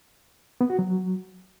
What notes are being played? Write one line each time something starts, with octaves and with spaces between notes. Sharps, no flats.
B3
F#4
F#3